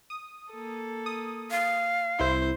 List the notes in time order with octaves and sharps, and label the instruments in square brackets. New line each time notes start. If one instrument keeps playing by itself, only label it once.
[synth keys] D#6
[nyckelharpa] A#3 A4
[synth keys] D#6
[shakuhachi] F5
[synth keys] C2 E4 C6 [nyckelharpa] C5